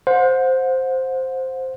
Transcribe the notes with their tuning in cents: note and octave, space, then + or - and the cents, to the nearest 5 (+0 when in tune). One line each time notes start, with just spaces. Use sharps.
C5 +0 F#5 -40